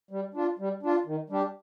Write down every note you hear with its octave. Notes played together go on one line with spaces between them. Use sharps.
G3
D4 F4
G3
D4 F4
D#3
G3 D4 G4